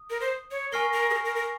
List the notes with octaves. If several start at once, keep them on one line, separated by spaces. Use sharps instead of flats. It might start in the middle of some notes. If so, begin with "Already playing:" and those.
Already playing: D#6
A#4
C5
C#5
A#4 G#5 C#6 F6 C7 G7
A#4
G#4
A#4
A#4
A#4